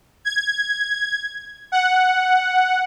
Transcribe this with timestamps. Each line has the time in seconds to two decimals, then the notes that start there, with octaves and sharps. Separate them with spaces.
0.25 G#6
1.72 F#5